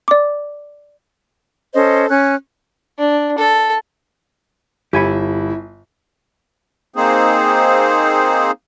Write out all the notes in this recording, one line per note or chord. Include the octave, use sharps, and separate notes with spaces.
D5 D6
C#4 A4 C5 D#5
C#4 G#5 F#6
D4
A4
G1 E4 G4 G#5 B5
A#3 C4 D#4 G#4 C5